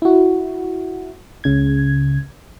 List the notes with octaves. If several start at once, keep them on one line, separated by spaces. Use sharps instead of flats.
E4 F#4
C#2 C#3 G#6